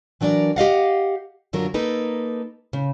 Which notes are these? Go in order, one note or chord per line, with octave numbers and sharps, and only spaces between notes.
E3 F#3 D4 A#4 D5
G4 D#5 F5 F#5
F#2 D3 F#3 F4 A#4
A#3 D#4 A4 B4
C#3